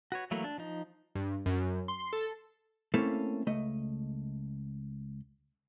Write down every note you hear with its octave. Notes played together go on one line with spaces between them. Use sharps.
F#4 B4 C#5
E3 F#3 A3 A#3 B4
D4
F3 D#4
G2
F#2
C6
A4
A3 A#3 C4 C#4 E4 A4
C#2 A3 D#5